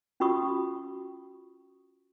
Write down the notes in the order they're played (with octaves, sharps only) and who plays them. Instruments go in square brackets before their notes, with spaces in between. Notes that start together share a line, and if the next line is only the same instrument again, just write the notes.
[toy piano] C#4 F4 F#4 B5 C#6 D#6